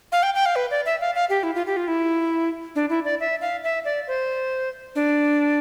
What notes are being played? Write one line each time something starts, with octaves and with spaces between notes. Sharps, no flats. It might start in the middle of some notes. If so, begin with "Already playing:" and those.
F5
G5
G5
F5
B4
D5
E5
F5
F5
G4
E4
F4
G4
F4
E4
D4
E4
D5
E5
F5
E5
D5
C5
D4